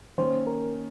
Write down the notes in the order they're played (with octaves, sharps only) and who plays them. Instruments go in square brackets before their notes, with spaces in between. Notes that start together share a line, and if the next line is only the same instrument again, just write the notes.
[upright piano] D#3 A#3 C#4 [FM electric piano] C5
[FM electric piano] A#4